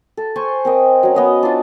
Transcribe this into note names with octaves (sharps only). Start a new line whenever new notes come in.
A4
C5 G#5 C6 C#6
C4 A#4 D#5
F#3 C#4
B3 D#5 F5
D4 D#4 F4 F#4